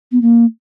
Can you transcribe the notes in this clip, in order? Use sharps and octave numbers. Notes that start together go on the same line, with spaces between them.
B3
A#3